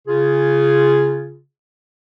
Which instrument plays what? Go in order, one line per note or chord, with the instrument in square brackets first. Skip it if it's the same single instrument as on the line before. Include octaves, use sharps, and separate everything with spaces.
[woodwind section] C#3 F4 G#4